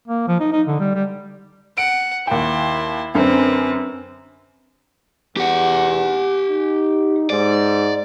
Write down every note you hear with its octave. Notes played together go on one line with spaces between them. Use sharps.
A#3
F3
D#4
D#4
D3
G3
G3
F#5 D7
D#2 E4 G5 C6
F#2 D3 C4 B4
E2 G4 F#5
D#4
G#2 D5